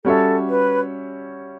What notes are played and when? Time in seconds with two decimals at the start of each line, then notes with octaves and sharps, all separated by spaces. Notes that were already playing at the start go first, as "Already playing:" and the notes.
0.05 G3 C#4 F#4 A4 C#5 E5
0.49 B4